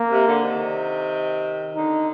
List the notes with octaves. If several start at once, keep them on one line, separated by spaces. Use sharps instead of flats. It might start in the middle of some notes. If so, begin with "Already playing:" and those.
Already playing: A#3
C3
D3
C3 D#3
D3 D#4